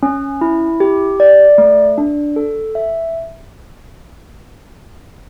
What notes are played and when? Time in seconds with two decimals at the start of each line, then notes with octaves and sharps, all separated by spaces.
0.03 C#4
0.41 E4
0.80 G4
1.20 D5
1.58 A3
1.98 D4
2.36 A4
2.75 E5